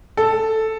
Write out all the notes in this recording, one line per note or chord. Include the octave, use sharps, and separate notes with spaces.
A4